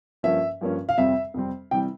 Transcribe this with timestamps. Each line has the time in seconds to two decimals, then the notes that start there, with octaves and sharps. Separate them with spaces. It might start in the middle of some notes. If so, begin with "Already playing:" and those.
0.23 G2 F3 A#3 C#4 E5
0.61 G2 F3 A#3 C#4
0.89 F5
0.98 F2 C3 G3 C4 E5
1.34 F2 C3 G3 C4
1.71 C3 E3 G3 G5